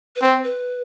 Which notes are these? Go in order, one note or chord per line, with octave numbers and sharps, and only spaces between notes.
B4
C4 C5
B4